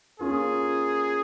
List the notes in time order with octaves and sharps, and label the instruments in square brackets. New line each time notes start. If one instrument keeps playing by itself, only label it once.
[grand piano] A#3 C#4 F4 A#4 [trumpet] G#4